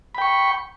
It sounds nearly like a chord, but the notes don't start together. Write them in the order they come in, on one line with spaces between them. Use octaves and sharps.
B5 G5 C#6